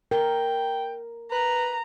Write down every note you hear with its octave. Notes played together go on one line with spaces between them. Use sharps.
A#4 G5
B4 A#5